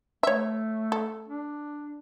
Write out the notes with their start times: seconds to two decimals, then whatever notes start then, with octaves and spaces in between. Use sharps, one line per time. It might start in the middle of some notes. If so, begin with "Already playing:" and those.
0.23 A3 C#5 E5
0.92 A4
1.28 D4